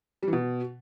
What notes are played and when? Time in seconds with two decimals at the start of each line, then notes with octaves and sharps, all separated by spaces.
0.23 G3
0.28 E3
0.33 B2